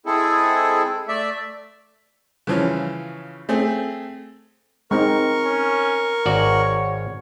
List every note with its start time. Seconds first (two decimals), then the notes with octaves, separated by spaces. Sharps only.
0.06 G#3 C4 E4 G#4 A4
1.08 A3 D5 E5
2.47 C#3 E3 F3 C#4
3.49 A3 C4 G#4
4.91 G#3 C4 D#4 A#4 C#6
5.45 C#4
6.26 G#1 F#4 C#5 D5